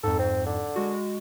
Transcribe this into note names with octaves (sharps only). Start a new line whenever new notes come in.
F2 G#2 A4
C4
D3
G#3 F#4